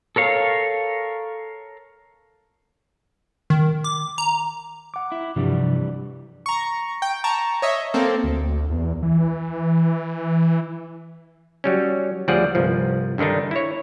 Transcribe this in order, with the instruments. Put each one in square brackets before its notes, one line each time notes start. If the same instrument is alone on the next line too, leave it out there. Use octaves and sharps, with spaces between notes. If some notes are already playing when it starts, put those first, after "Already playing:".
[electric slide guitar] A4 A#4 C#5 F5
[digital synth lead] D#3
D6
A#5
[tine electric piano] F#5 D6
[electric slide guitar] E4
[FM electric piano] G2 D4 [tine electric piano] C3 F3 [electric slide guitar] E3 G3
[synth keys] A#5 C#6
G5
A5 A#5 C#6
C#5 D#5 E5
A#3 C4 A4
[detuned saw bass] D2
E2
E3
[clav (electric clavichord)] F#3 G3 C#4
D2 F3 G3 G#4 D5 F#5
G1 C2 F3
G2 D3 D#3 D4 D#4
E4 C#5